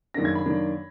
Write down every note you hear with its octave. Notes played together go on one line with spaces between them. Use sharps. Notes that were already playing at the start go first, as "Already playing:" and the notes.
F#2 D#3 A#3 D4 A#6
G#6
B5
F#2 D#3 A#3 D4